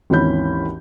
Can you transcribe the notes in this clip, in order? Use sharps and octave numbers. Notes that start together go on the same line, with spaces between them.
G#1 D#2 E3 C#4 B5 G6